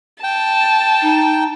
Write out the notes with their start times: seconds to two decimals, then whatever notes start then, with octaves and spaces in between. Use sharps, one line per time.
0.24 G5 A5
1.02 D#4